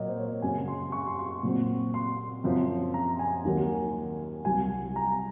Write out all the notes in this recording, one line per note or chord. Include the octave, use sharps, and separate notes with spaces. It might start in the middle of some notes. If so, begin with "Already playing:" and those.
Already playing: A#2 F#3 A#3 C#5 D#5
C5
C#5
F#2 C#3 F#3 G#5
C6
C#6
C6
C#6
A#2 F#3 C4
C6
F#2 F3 C4
A#5
G#5
D#2 D#3 F#3 A#3
C2 C3 F#3 G#5
A#5